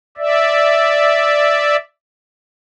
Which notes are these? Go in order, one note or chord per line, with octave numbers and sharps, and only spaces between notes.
D5 E5